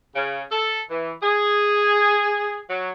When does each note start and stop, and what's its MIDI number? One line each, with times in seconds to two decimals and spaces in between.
0.15 0.42 49
0.51 0.82 69
0.90 1.12 52
1.22 2.58 68
2.70 2.91 54